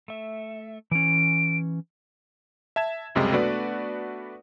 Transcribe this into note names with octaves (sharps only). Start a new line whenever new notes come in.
A3 E5
E3 C#4 D7
E5 A5 G#6 E7
C#2 F#2 C3 G3 G#3
A3 B3 D4 F#4 B4 D5